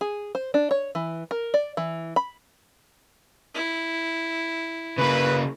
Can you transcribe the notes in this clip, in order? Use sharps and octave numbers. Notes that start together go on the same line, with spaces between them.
G#4
C5
D4
C#5
E3
A#4
D5
E3
B5
E4
C#3 A#3 B4